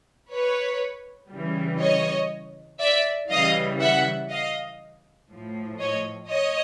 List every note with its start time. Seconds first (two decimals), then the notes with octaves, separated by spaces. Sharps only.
0.31 B4 C#5
1.30 C#3 E3 G3
1.81 C#5 D#5
2.80 D5 E5
3.30 C#3 E3 G3 D#5 F5
3.80 E5 F#5
4.30 D#5 F5
5.30 A2 F3
5.79 C#5 D#5
6.29 C#5 D#5